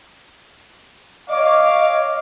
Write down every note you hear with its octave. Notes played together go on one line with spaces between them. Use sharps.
C#5 D#5 F5 D6